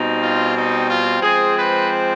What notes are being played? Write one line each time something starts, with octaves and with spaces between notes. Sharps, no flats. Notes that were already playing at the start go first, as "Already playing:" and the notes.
Already playing: B2 G3 C4 D#4
F4
D#4
F4
F3 G#3 C4 G#4
B4